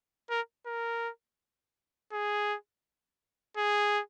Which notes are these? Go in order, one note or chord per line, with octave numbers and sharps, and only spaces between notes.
A#4
A#4
G#4
G#4